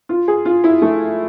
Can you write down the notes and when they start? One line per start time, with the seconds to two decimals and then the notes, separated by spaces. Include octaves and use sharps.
0.09 F4
0.28 G#4
0.45 F4
0.64 E4
0.82 A3